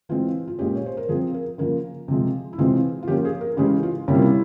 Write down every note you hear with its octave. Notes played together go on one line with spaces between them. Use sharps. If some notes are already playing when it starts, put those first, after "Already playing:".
E3 G#3 C4 F4
F4
A#2 G#3 C#4 G4
C#5
C5
A#4
F3 C4 G#4
A#4
C#3 F3 A#3 A#4
C3 F3 G#3
E4
C3 E3 G#3 C4 F4
F4
F3 A#3 C#4 G4
G#4
A#4
C#3 E3 G#3 C#4 G4
F4
C3 G3 A#3 C#4 E4
F4
E4